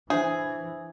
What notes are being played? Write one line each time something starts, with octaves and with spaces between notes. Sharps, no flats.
E3 D4 G#4 C5 E5